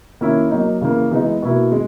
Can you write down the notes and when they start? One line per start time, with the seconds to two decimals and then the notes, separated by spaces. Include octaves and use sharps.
0.21 D#3 A#3 C#4 E4
0.51 F#3 A#3 D#4
0.81 C#3 E3 A#3
1.11 E3 G#3 B3 D#4
1.42 B2 A#3 E4
1.72 G#3